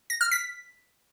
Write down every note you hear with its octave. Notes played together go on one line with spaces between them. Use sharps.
A#6
F6
B6